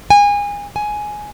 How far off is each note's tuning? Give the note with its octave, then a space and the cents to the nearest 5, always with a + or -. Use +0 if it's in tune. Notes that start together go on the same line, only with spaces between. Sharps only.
G#5 -25
G#5 +10